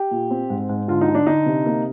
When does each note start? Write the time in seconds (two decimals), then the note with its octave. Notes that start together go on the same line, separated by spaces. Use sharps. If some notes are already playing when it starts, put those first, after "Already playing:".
Already playing: G4
0.11 A#2
0.31 C4
0.50 G#2
0.69 G#2
0.88 D3 F4
1.01 D#4
1.08 D3
1.15 D4
1.26 D3 D#4
1.46 C3
1.66 A#3